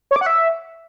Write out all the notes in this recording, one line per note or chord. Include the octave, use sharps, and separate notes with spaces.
C#5
D6
F#5
E5